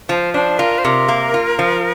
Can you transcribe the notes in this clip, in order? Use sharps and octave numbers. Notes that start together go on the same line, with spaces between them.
F3 C5
D4 C5
F4 A#4
C5
C3 A#4
A#3
F4
F3